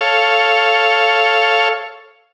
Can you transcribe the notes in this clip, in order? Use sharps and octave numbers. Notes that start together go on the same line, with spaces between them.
A4 C#5 F5